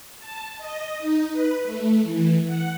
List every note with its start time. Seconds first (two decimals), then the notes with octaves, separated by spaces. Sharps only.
0.19 A5
0.58 D#5
0.99 D#4
1.31 B4
1.64 A3
2.03 E3
2.46 F#5